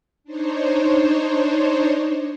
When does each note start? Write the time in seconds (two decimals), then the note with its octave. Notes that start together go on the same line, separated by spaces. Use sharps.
0.24 D4 D#4 C5 C#5